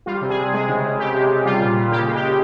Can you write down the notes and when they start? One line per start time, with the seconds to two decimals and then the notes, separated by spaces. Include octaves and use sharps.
0.06 G3 F4
0.21 C3
0.29 G#4
0.38 C3
0.53 G#3 G#4
0.69 C#3
0.84 C#3
0.99 C3 G4
1.14 G#3
1.30 C3
1.45 G3 F4
1.61 A#2
1.76 A#2
1.91 C#3 G4
2.07 G#3
2.15 G4
2.23 C#3